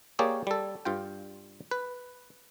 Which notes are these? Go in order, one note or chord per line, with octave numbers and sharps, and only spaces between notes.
A#3 G4 G#4 C#5 D5
G3 A4
G2 F4 G5
B4